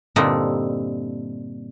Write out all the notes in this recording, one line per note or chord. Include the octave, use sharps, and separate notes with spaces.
G2 A#2 D3 C4 D#4 E4